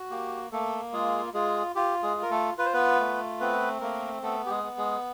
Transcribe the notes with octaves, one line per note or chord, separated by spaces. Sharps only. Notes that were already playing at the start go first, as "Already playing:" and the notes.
Already playing: F#4
A#3 G4
A3 A#3 A4
G#3 F4 G#4
G#3 F4 G#4
F4 G4
G#3 G#4
F4
A#4
A3 A4
F4 B4
C5
B3 B4
A3
B3 C4 B4
A3 A#3 A#4
A3 B3 A4
G4
G#3 G#4
B3
G#3 G#4